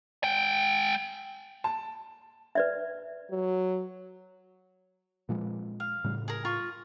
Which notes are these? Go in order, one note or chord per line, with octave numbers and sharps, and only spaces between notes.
G#3 G5
A5
B4 D5 E5
F#3
A#2 F3 G#3
F5
A2 C#3 G3
G#4 A#4
F4 C#6